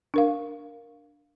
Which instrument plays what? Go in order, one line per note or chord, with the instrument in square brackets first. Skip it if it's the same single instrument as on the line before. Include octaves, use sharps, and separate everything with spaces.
[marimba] D4 A#4 F5